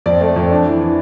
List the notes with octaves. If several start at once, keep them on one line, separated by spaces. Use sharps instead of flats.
F2 D5
A3
F2
D4
E3
E3